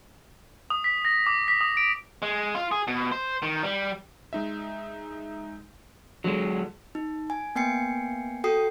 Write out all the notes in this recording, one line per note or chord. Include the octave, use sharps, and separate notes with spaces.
D#6
B6
A#6
D6
B6
D#6
D7
G#3
F4
G#4
B2
C5
D#3
G3
G#3 D#4 E5
D3 F#3 G#3
D#4
G#5
A#3 B3 G5 G#5 C7 C#7
F#4 A4 G5 D#6 C7